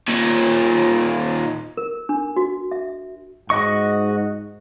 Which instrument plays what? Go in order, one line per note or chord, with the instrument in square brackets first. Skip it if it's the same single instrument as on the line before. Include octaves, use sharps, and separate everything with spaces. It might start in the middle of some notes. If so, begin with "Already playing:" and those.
[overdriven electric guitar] D#2 A#2
[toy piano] A#4
D4
F#4
E5
[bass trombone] G#2 [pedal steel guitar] F#4 D#5 C#6